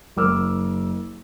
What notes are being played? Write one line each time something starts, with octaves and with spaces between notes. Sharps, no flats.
F#1 A#4 D6 E6 F6